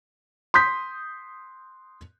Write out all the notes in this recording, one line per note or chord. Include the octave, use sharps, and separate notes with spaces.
C6 D#6 G6 B6